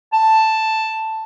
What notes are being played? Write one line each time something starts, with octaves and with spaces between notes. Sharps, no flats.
A5